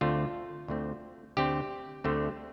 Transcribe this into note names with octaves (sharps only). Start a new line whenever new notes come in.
D2 D3 A3 C4 F4
D2 D3 A3 C4
D2 D3 A3 C4 G4
D2 D3 A3 C4